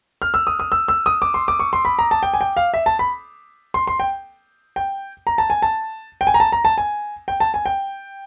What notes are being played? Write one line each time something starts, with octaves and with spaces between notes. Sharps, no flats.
F6
E6
D#6
D#6
E6
E6
D#6
D6
C6
D6
C#6
C6
B5
A#5
A5
G5
G#5
G5
F5
E5
A5
B5
C6
C6
G5
G5
A#5
A5
G#5
A5
G5
G#5
A#5
A5
A#5
A5
G#5
G5
A5
G#5
G5